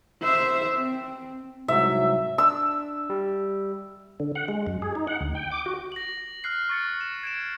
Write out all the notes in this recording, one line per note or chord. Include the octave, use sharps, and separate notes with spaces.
C5 E5
C4
C2 G#2 F#3 E5
D4 E6
G3
D3
F#5
G#3
F#2
G#4
D#4
F#5
D2
G5
D6
F#4
A#6 F#7
F6 F#6 C7
C#6 A6 C#7
E7
G#6 D7 E7